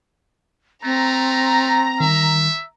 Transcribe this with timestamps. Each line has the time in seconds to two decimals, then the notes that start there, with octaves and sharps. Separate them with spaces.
0.84 A3 C4 A#5
2.00 D#3 G3 E5